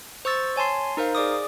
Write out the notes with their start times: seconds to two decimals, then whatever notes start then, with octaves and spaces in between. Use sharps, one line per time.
0.25 C5 C#6 E6 A6
0.56 C#5 G#5 A5 C6 C7
0.97 D#4 A#4 C5 F5
1.15 G#4 D5 D6 D#6